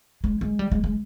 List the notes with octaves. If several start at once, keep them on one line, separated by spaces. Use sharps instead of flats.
G#3
G#3
G3
G#3
G#3